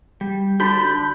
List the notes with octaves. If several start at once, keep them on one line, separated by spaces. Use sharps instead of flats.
G3
D3 D4 F#4 A5 B5 G6